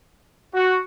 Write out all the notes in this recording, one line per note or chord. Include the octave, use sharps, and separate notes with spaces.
F#4